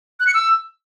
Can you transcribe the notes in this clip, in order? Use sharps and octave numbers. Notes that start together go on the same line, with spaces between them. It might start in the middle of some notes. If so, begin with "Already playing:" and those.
F#6
C#7
E6